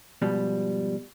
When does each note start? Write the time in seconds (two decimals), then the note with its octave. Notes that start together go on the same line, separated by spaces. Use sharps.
0.22 G#2 B2 F3 G3